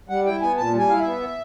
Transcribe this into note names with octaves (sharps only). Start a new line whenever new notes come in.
G3 F#5
E4 G5
B3 G#5
A#2 A5
G3
G#5
E4 F5
B3 E5